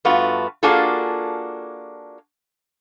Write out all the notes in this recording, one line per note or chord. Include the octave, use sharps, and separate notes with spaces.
G2 A3 B3 F4 F#4
A#3 D4 F4 F#4 G#4 A4